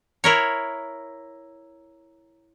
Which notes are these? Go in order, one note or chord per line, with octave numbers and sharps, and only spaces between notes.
E4 A#4 C#5